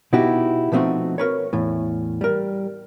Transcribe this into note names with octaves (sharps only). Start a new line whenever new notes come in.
B2 B3 D#4 E4 F#4 G4
B2 F3 A3 C4 D#4 F#4
F#4 A#4 B4 C#5
E2 A2
G3 A#4